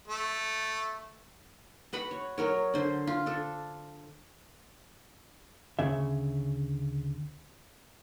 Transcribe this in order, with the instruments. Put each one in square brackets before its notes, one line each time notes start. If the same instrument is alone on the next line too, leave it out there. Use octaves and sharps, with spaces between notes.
[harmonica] A3
[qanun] F#4 B4 F#5 B5
C#5
F#3 A#4 C#5
D3 C5
F4
D4 A4
[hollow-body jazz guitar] D2 C#3 E5